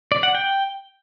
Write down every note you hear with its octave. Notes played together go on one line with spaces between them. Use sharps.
D5
F#5
G5